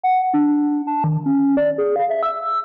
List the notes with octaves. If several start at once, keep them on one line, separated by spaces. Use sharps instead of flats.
F#5
D4
A5
D#3
C#4
D5
G#4
F5
E5
E6